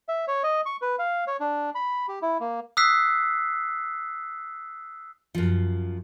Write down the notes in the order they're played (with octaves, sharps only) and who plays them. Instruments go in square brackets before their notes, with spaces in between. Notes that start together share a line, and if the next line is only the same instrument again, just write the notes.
[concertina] E5
C#5
D#5
C#6
B4
F5
C#5
D4
B5
G4
E4
A#3
[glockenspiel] D#6 E6 F#6 B6 C7
[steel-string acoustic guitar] F#2 F3